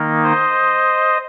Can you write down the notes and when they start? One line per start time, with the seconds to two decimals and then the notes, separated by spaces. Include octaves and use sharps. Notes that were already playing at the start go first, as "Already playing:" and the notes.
Already playing: D#3 A#3 D#4
0.23 C5 D#5